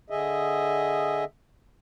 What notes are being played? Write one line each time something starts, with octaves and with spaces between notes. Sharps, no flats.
D3 G#4 D#5 E5